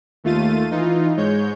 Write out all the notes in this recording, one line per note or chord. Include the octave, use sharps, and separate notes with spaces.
D#2 A3 F4 A6 D#7
E3 D#4 F4
G#2 G#3 C#5 G6